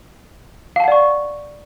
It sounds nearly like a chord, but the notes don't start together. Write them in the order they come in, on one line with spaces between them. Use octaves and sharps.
F5 A5 F#5 D5 C#6